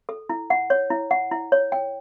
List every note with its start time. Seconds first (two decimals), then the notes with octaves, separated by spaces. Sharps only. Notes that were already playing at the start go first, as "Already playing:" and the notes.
0.09 A4
0.29 E4
0.50 F#5
0.70 C#5
0.90 E4
1.11 F#5
1.31 E4
1.52 C#5
1.72 G5